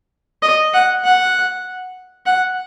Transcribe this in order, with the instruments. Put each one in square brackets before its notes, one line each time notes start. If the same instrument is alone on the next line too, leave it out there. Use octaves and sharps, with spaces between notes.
[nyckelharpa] D#5
F#5
F#5
F#5